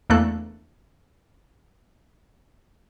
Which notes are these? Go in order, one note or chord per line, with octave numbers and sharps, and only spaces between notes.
E2 A3 A#3 D4 A4 F#6